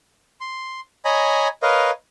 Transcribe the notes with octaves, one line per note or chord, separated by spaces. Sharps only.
C6
C#5 D#5 G#5 A#5 B5
A#4 B4 C#5 D#5 F5